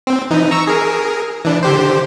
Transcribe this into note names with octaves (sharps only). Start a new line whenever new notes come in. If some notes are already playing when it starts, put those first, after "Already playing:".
C4
E3 D#4
A#5 C#6 E6
G#4 A#4
E3 D4
D3 G4 C5